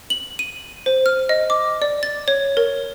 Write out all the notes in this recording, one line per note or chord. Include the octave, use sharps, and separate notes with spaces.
F#7
D#7
C5
F6
D#5
D6
D5
A6
C#5
A#4